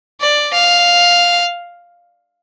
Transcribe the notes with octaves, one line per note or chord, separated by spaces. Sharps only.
D5
F5